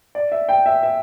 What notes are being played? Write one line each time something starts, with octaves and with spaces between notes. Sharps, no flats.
D5
E5
G5
E5
E5